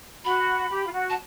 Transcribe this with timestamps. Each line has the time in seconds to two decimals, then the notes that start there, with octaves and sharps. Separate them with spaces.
0.25 F#4 B5
0.70 G4
0.87 F4
0.92 F#4
1.10 A5